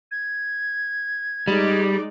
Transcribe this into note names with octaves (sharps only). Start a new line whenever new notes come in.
G#6
G3 G#3 D#4 D5